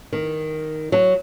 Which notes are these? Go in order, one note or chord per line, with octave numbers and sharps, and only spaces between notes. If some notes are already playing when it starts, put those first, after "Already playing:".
D#3
F#3